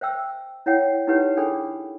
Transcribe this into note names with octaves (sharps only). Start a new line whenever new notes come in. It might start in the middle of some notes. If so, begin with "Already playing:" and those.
C5 E5 G5 E6
E4 C#5 E5 F#5 G5
D#4 E4 G4 B4 C#5 F#5
D4 G#4 A4 G5 B5